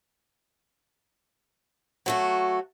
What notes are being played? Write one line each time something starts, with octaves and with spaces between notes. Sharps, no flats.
F#3 A3 F#4